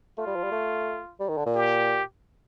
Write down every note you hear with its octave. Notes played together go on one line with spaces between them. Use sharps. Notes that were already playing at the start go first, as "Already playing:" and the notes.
A3 F4
G3
F3
G3
A3
G3
D#3
D3
A#2
G4